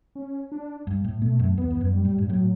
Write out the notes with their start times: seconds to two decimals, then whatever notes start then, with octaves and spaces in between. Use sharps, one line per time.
0.15 C#4
0.52 D4
0.87 G2
1.04 A2
1.22 B2 A3
1.39 F#2
1.57 E2 B3
1.70 E2
1.81 F#2
1.93 G3
2.05 A2
2.18 G2
2.29 A2 F#3